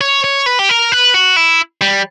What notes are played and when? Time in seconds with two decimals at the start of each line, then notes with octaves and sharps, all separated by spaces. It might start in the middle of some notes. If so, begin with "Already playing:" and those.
0.01 C#5
0.24 C#5
0.46 B4
0.59 G4
0.69 A#4
0.92 B4
1.14 F#4
1.36 E4
1.81 G3